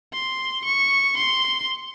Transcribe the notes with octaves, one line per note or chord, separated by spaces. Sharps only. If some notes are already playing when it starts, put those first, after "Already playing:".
C6
C#6
C6